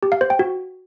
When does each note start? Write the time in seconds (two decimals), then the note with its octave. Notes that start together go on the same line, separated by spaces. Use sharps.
0.03 G4
0.12 F5
0.21 C5
0.30 G5
0.39 F#4